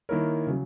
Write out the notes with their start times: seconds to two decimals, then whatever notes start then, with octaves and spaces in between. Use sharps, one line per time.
0.09 D#3 A#3 E4 A#4 C#5
0.47 C#3 F#3